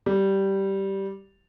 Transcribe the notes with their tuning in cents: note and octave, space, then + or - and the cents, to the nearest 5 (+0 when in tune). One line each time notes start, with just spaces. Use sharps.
G3 -10